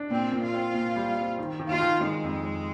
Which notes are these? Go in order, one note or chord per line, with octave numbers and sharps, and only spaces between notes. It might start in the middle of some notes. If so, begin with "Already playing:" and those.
Already playing: D4
A#2 C4
A#2
F4
C4
A#2
G3
C4
D#3
D#3
F4
D#3
D#3 G#3
F2
F2